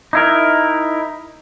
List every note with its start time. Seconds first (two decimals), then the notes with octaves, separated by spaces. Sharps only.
0.13 D#4 E4 A#4